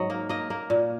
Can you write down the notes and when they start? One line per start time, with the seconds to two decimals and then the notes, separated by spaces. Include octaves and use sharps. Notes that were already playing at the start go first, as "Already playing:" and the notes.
Already playing: G#2 F#3 D#5
0.10 A#3
0.29 A#3 D#5
0.50 A#3
0.70 A#2